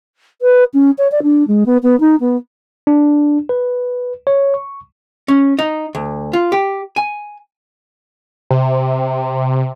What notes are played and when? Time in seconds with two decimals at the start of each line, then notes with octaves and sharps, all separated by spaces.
0.41 B4
0.73 C#4
0.98 C#5
1.11 D5
1.23 D4
1.47 G#3
1.66 B3
1.83 B3
2.00 D#4
2.20 B3
2.87 D4
3.49 B4
4.27 C#5
4.54 C#6
5.28 C#4
5.59 D#4
5.95 D2
6.33 F4
6.52 G4
6.96 G#5
8.50 C3